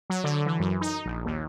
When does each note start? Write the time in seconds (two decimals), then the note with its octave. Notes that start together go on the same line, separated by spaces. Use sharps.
0.10 F#3
0.24 D3
0.46 E3
0.60 F#2
0.81 D#4
1.06 A#1
1.25 D#2